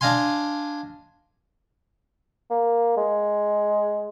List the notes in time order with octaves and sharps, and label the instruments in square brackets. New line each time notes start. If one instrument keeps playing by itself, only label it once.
[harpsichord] D4 D5 D#5 F5 G#5 C6
[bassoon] A#3
G#3